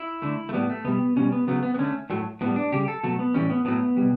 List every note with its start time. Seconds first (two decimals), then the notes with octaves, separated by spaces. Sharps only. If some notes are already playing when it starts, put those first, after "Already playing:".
Already playing: E4
0.22 D3 A3
0.49 A3
0.53 A2 G3 B3
0.70 A3
0.85 B2 G3 B3
1.16 B2 G3 C#4
1.32 B3
1.47 C#3 F#3 A3 B3
1.63 B3
1.74 B3
1.79 D3 A3 C#4
2.10 A2 F#3 A3
2.41 A2 G3 B3
2.56 D4
2.72 C#3 G3 G4
2.88 A4
3.03 B2 F#3 A3 A4
3.19 B3
3.34 A2 E3 G3 C#4
3.50 B3
3.65 A2 F#3 A3 B3
3.97 B2 G3